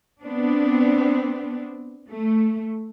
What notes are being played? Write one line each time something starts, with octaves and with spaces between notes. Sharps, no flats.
B3 C4 D4
A3